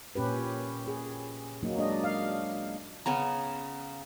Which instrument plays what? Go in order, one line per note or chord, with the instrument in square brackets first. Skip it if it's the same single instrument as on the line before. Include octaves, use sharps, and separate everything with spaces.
[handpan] A#2 C#4 G4 B4
G#4
F#3 A#3 D#4
G#3 D4 D#5
F5
[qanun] C#3 B3 C#4 [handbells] A#5